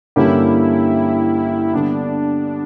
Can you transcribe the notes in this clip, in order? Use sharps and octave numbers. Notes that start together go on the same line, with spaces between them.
G2 D3 A#3 C#4 E4 G4
D3 G3 B3 D4